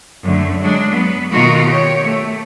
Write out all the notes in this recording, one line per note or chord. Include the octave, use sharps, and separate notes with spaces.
F#2 D3 A3
F#3 G#3 D4
F#3 B3
B2 D#3 A3 F4 F#4 A#4
G4 C#5
A3